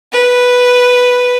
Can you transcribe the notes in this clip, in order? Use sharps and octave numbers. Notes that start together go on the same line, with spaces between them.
B4